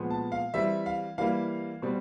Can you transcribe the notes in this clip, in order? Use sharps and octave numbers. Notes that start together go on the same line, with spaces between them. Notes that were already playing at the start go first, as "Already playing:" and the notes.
Already playing: A#2 F3 G#3 B3
A5
F5
E3 G3 C4 E5
F5
E3 G3 A#3 F5
B2 G3 C4